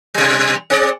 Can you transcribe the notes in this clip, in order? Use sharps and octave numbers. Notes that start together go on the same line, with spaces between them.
B2 G3
C4 G#4 D5